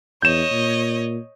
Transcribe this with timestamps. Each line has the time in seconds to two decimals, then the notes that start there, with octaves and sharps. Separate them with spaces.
0.22 E2 C#5 D#5 G6 E7
0.51 A#2